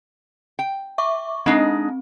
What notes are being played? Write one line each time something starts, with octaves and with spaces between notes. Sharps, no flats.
G5
E5 C#6 D6
G#3 C4 D4 D#4